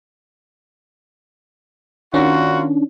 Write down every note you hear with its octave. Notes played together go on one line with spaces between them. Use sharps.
D#3 A#3 C#4 D4 F4 F#4